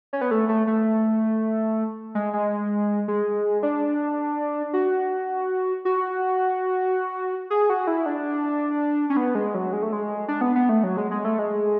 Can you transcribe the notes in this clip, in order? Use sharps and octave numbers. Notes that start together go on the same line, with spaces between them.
C#4
B3
A3
A3
A3
G#3
G#3
G#3
D4
F#4
F#4
G#4
F#4
E4
D4
C#4
B3
G#3
F#3
G#3
A3
G#3
D4
B3
B3
A3
F#3
G#3
G#3
A3
G#3